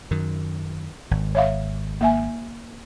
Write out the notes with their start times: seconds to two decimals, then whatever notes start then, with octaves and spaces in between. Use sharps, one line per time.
0.11 F#2 D#3
1.11 G#1
1.35 C#5 E5 F5
2.01 A#3 E5 G#5